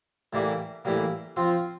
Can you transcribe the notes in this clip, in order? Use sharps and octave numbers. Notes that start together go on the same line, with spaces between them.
A2 E3 G3 A#3
A2 E3 G3 A#3
F3 C4 F4